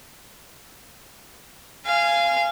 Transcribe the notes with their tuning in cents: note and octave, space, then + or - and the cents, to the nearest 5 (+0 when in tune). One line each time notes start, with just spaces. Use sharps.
F5 -20 G#5 +0